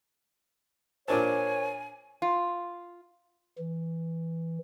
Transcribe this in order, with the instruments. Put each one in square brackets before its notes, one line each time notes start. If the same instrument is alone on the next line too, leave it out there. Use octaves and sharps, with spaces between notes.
[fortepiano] A#2 D4 A5 [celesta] A#4 C5 [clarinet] C#5 [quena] G#5
[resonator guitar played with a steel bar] F4
[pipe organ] E3